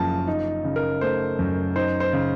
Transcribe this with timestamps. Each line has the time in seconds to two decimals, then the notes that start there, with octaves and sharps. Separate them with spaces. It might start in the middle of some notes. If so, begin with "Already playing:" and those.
Already playing: F#1 F#2 F3 A5
0.28 D#4
0.64 C#3
0.76 A#4
1.01 A3 C5
1.39 F#2
1.76 D#4 C5
2.00 C5
2.13 C#3